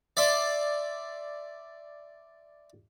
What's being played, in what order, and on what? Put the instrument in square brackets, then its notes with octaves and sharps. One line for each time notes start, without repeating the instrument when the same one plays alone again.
[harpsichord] D5 E5 C6